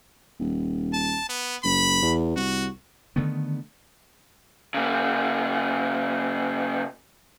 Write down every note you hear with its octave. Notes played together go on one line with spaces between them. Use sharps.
D#1
A5
B3
F#1 B5
E2
C2 F#4
D3 D#3 A3 B3
C#3 A#3